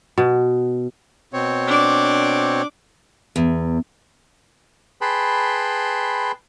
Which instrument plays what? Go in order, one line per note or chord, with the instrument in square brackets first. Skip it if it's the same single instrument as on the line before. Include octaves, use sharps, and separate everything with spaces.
[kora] B2
[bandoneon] B2 C4 C#5
[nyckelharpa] D4 D6
[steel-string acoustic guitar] E2
[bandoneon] G#4 B4 G5 A5 B5 C6